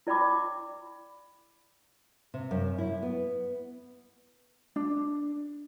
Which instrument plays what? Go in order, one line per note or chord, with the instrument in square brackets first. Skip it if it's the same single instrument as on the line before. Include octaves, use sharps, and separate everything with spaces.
[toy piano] E4 D5 G5 B5 D6
[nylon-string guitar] C3
F#2
E4
B3
[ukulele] D4